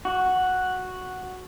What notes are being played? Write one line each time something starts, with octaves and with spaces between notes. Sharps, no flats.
F#4